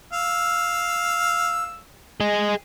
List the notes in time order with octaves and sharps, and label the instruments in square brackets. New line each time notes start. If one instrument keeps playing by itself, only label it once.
[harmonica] F5 E6
[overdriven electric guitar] G#4 D#5